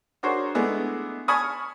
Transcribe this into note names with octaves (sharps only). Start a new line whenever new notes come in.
D4 F#4 G#4 A#4 C5 C#5
G#3 A3 B3 D4 E4 G#4
G#5 A5 B5 C#6 D#6 F6